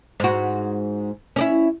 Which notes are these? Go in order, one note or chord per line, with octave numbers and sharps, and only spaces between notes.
G#2 F#4
C#4 D4 E4